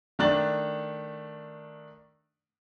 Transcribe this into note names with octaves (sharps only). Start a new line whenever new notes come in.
D#3 A3 D4 F#6 A6 F#7